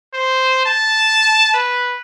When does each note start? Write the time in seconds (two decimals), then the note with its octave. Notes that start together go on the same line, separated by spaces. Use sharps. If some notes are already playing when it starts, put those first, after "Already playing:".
0.14 C5
0.66 A5
1.54 B4